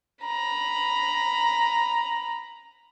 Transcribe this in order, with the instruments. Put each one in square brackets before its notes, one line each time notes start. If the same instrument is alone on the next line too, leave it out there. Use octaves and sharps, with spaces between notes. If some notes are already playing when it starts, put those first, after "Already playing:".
[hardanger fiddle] A#5 B5